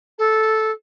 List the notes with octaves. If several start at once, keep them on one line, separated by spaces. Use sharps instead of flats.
A4